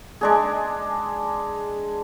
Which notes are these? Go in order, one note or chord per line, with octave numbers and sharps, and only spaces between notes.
G#3 D4 G#4